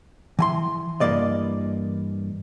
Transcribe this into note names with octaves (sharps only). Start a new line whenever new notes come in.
E3 G#5 C6
G2 C#3 E3 A#3 D5 D#5